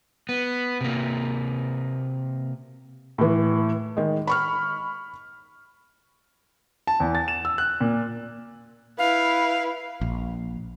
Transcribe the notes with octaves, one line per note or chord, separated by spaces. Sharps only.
B3
C3 A#3
A2 E3
D#3 G#3
B5 C#6 F6
A5
E2
A6
E7
E6
F#6
A#2
E4 B4 F5
A#1